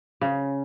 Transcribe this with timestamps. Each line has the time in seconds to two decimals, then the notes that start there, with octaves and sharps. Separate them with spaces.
0.21 C#3